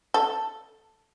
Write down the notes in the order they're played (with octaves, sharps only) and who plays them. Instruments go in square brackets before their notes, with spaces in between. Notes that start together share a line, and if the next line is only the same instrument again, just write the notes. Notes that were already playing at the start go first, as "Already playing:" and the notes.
[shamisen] A4